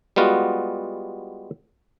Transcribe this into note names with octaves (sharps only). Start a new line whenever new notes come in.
G3 G#3 B3 F4 F#4